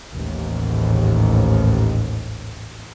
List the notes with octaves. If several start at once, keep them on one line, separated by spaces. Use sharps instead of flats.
A1 D#2 G#2